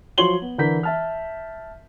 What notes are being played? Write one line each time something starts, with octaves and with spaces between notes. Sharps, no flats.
F3 F#3 C#5 C6 F#7 G7
B3
D3 E3 A#4 G6 B6
E5 A5 F6